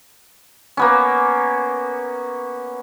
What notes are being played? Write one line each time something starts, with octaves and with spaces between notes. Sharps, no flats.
A#3 B3 C#4